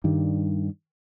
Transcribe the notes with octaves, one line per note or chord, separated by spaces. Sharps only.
G2 D#3 G3